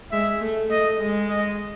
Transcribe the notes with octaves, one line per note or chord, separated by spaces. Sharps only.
G#3 E5
A3
A3 D#5
G#3
D#5